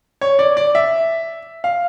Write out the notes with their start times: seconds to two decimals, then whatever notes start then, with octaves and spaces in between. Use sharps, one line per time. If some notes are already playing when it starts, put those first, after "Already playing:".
0.21 C#5
0.39 D5
0.57 D5
0.75 E5
1.64 F5